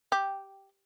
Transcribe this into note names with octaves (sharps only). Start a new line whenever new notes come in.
G4